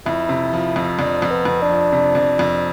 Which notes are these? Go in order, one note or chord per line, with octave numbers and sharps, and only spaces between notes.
F2 E4
C3
F3
F2
F2 D4
F2
B3
F2
D4
F3
C3
F2
F2